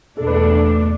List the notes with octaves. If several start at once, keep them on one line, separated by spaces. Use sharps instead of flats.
E2 B2 A3 D4 A4
B4
A4